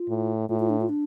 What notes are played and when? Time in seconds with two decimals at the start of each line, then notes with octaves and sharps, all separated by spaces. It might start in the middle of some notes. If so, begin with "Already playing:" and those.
Already playing: F4
0.09 A2
0.49 A2 F4
0.60 F4
0.69 D4
0.80 F4
0.89 D4